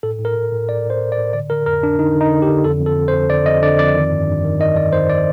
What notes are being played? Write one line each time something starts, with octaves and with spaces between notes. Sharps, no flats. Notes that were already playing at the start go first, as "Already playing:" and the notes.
A2 A4
A2
A#4
A2
A2
A2 D5
A2
C5
A2
D5
A2
D3 D5
D3 A#4
F2 A#4
F2 D4
D3 D#4
D3
D#4
D3
G4
D3
F2 A4
F2
A4
F2
C5
F2
D3 D5
F2 D#5
D3 D5
F2 D5
D#3
G2
G2
D#3
D#3 D#5
D#3 D5
D#3 C5
D5